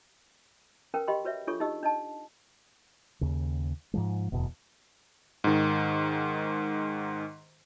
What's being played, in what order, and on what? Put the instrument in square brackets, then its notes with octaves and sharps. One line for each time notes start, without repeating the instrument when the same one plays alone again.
[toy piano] C#4 A#4 B4 G5
G4 D#5 F5 G5 B5 C6
F#4 B4 C#5 E5
D4 F4 G#4 A4 C#5 C#6
D#4 G4 D#5 E6
D4 D#5 A5
[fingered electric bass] D#2 C#3
G#2 F3 G#3
D1 E2 B2
[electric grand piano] G#2 D#3